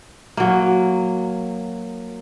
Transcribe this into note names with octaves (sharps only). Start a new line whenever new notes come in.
F#3 A#3